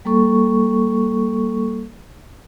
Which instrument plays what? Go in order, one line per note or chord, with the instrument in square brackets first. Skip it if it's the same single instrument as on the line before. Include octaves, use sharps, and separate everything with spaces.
[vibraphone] G3 A#3 A4 C#6